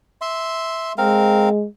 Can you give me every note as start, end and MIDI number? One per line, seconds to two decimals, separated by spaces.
0.21 0.92 76
0.21 0.92 84
0.98 1.66 56
0.98 1.49 60
0.98 1.49 70
0.98 1.49 77